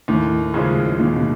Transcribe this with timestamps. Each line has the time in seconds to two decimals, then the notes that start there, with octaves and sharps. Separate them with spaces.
0.08 D#2 A2
0.54 C#3 F3 G#3
0.99 D#2 A#2
1.16 B2